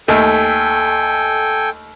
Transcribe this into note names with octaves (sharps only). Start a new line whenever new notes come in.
D#2 A3 A4 G5 G#5